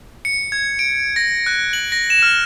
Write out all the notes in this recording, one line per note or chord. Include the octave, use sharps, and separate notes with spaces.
C#7
G#6
D7
A#6
F#6
F#7
A#6
E7
F6